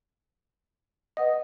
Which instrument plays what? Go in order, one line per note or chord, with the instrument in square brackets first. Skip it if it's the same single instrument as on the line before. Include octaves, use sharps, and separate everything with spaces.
[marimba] B4 F#5 D#6 [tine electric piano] D#5